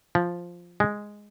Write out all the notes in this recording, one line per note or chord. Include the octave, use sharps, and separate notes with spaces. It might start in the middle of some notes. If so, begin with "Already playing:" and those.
F3
G#3